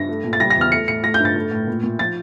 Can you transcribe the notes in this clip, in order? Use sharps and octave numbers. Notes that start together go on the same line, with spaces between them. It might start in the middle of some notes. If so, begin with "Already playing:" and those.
Already playing: G2 A#6
A3
A#2
A6
G3 A#6
A#6
E2 F6
A3 C#7
A2 C#7
A3 A#6
G6
G2
A6
A3
A2
A#2
A#2
F3 A6